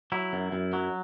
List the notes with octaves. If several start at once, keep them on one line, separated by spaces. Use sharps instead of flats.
F#3 E4
F#2
F#2
F#3